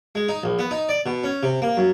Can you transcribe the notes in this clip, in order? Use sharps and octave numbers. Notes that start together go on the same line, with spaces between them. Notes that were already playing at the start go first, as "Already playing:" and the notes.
G#3
D#4
A#1
B3
D#4
D5
B2
C#4
C3
A#3
F#2